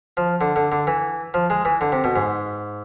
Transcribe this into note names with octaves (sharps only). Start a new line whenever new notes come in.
F3
D3
D3
D3
E3
F3
G#3
E3
D3
C3
B2
G#2